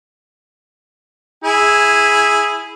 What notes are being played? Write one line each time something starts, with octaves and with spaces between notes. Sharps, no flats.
E4 G#4